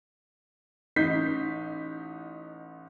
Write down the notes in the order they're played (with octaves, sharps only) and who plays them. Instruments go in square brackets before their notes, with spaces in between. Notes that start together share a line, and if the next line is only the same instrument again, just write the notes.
[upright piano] A1 D#4 G6 B6